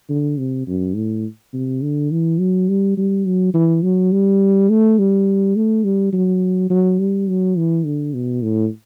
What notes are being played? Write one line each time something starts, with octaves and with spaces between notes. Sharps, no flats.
D3
C3
F#2
A2
C3
D3
E3
F#3
G3
G3
F#3
E3
F#3
G3
A3
G3
A3
G3
F#3
F#3
G3
F#3
E3
D3
B2
A2